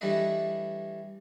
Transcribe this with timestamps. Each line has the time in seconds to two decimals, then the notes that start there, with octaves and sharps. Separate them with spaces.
0.01 E3 G3 A3 D4 B4 D#5